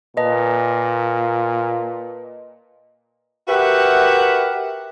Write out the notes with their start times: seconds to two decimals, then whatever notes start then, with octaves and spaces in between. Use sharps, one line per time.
0.17 A#2 B4 D#5 A5
3.48 F#4 G4 A#4 B4 E5 F#5